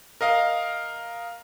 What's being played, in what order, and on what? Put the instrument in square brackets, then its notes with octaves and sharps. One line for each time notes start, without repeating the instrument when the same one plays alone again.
[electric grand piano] A#4 D#5 F5